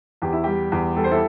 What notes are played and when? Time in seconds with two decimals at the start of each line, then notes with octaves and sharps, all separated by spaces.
0.22 E2 G4
0.33 E4
0.44 G3 G4
0.72 E2
0.96 G3 A4
1.04 C5
1.11 E4 A4